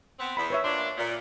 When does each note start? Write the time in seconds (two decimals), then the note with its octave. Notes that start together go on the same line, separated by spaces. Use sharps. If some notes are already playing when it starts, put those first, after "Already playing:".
0.19 B3 C4
0.37 E2 B5
0.50 B4 C#5 E5
0.64 A#2 D4 C6
0.97 A#2